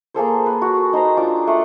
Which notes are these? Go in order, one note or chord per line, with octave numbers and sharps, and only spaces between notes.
A#3 G#4 A4 C5
B4
F#4
D#4 C5 A#5
D4 F4 D6
A3 F#5 C6